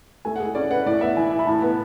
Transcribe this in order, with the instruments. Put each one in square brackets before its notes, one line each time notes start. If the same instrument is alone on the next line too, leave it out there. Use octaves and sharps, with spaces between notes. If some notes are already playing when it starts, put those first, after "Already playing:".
[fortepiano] A3 [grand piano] G#5
[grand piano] F#5
[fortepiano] G#4
[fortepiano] C#4 [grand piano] D5
[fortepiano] B4 [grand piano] F#5
[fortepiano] A2 [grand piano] D5
[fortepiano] B3 [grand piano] E5
[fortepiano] E3 [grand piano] G#5
[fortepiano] E4
[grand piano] B5
[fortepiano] A2 [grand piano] A5
[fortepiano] B3